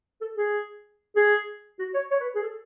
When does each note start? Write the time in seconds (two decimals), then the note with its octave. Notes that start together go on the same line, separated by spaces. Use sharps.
0.21 A4
0.37 G#4
1.16 G#4
1.79 F#4
1.94 C#5
2.11 C#5
2.20 B4
2.35 G#4
2.43 A4